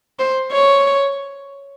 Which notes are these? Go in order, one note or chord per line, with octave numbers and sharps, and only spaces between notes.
C5
C#5